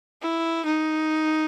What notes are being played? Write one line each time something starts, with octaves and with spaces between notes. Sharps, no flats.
E4
D#4